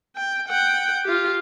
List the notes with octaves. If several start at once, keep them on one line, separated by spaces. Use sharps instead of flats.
G5
F#5 G5
F4 G4